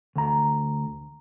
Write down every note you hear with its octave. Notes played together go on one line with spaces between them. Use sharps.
D2 A#5